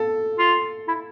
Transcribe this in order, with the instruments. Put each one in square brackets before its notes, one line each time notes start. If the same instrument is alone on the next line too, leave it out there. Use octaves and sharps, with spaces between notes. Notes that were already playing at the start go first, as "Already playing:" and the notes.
Already playing: [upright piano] A4
[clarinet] F4
E4